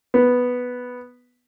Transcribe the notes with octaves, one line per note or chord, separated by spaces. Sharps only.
B3